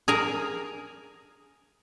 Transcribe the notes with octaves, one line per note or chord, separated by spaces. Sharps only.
G#4 A#4 G#5 A#5